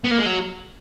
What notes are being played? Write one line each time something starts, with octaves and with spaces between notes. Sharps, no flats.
B3
A#3
G#3
F#3